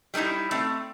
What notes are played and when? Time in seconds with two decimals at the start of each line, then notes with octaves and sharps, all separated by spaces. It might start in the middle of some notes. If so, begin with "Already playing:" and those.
0.14 G3 A3 A#3 D#4 E4
0.51 A3 C4